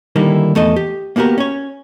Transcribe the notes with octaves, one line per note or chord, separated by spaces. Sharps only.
D3 D#3 G3 A#3 D#4 E4
E2 A3 A4 D#5
G4
A#3 B3 F#4 G4 A#4
C#4 C#5